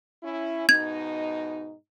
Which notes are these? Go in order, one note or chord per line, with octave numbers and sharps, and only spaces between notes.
C#4 E4
G#2 B2 D#4 G#6